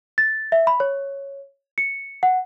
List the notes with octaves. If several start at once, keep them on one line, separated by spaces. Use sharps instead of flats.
A6
E5
B5
C#5
C#7
F#5